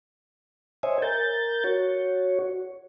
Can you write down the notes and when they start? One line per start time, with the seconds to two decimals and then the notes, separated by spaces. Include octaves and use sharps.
0.83 C5 C#5 D#5 E5 G#5
1.02 A#4 G6 A6
1.64 F#4 C#5